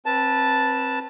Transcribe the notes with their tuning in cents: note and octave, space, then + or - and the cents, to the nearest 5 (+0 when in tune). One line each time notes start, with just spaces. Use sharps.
C4 +20 B4 -25 A5 +0